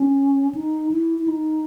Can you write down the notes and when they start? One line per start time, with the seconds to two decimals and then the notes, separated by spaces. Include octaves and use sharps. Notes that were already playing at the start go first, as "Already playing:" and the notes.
Already playing: C#4
0.55 D#4
0.91 E4
1.18 E4
1.28 D#4